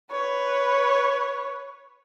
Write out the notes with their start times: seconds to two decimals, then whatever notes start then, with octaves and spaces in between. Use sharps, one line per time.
0.11 B4 C#5